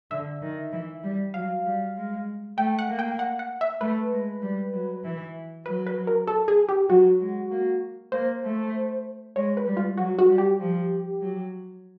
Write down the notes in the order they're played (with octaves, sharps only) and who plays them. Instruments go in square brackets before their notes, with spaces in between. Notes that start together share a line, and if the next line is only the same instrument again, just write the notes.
[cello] D3 [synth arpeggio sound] E5
[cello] D#3
E3
G3
[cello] F#3 [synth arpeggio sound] F5
[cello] G3
G#3
[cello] A3 [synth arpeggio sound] G5
[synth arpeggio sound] F#5
[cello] A#3
[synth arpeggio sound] G5
F#5
F#5
E5
[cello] A3 [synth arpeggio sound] B4
[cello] G#3
G3
F#3
E3
[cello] F#3 [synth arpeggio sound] B4
[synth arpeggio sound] B4
A#4
A4
G#4
G4
[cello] F#3 [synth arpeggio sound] F#4
[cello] G#3
A#3
[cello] A#3 [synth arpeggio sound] C5
[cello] A3
[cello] G#3 [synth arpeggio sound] C#5
[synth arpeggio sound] B4
[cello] G3
[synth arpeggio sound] F4
[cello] F#3 [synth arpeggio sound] F#4
[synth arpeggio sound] F#4
[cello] G3
[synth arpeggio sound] G4
[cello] F3
F#3